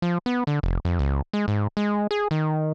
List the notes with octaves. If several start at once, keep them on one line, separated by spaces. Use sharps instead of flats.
F3
B3
D3
F1
F2
C#2
G#3
G#2
G#3
G#4
D#3